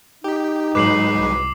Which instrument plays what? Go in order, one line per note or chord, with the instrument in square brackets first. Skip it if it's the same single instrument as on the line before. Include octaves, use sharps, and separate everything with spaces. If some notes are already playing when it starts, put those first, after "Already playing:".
[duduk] D#4 [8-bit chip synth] G4
[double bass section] G#2 [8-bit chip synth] F#3 G#3 B4 [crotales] D6 C7 F#7
[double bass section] C2